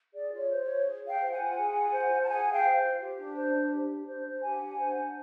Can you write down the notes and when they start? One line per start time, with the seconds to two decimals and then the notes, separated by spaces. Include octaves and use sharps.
0.12 G#4 D5
0.31 F4
0.36 C#5
0.49 C5
0.61 C#5
0.67 F4
0.85 G#4
1.02 F4
1.08 F5 G5
1.20 C5
1.32 F#5 G#5
1.38 F4
1.56 G#4
1.74 F4
1.91 C5
2.09 F4
2.22 A5
2.27 G#4 F#5 G#5
2.46 F4
2.51 F5 G5
2.63 C5
2.81 F4
2.99 G4
3.16 D4
3.34 C5
3.53 D4
3.70 G4
3.89 D4
4.05 C5
4.23 D4
4.41 G4 F#5 G#5
4.60 D4
4.78 C5
4.95 D4